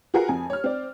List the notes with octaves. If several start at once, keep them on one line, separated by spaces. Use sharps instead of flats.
F4 F#4 G#4 A#4 B4 F#5
F2 G#5
C#5 F6
C4 D5